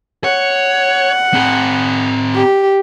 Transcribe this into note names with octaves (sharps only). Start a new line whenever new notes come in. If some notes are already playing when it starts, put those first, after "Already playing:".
C#5 F#5
C4 G#4
G4